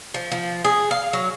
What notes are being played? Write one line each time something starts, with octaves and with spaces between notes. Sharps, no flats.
F3
F3
G#4
F5
F#3